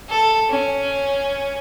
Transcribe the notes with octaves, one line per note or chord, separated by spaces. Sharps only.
A4
C#4